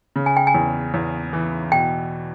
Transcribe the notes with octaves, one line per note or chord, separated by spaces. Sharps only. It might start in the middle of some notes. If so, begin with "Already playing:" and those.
C#3
G#5
G5
G#5
E2
E2
E3
B2 G5